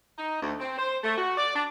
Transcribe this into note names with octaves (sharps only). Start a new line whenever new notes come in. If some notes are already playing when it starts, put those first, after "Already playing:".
D#4
D2
C4
C5
A3
F#4
D5
D4